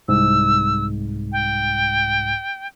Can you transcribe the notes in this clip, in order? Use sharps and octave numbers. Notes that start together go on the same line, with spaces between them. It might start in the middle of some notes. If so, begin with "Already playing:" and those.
C2 G#2 E6
G5